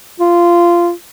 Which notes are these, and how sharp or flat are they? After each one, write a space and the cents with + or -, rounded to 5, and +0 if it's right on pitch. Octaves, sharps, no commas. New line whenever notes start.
F4 -15